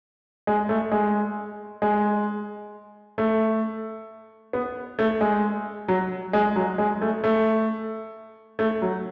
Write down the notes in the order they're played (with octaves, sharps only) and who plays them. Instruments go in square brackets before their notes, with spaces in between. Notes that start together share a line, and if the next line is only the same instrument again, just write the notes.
[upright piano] G#3
A3
G#3
G#3
A3
B3
A3
G#3
F#3
G#3
F#3
G#3
A3
A3
A3
F#3